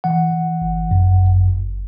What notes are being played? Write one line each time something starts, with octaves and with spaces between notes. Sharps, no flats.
E3 F#5
E3
G1
F#2
G1
G1